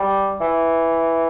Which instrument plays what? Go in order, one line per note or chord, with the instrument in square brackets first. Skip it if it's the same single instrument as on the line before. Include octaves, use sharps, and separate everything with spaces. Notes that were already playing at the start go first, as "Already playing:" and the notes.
Already playing: [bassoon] G3
E3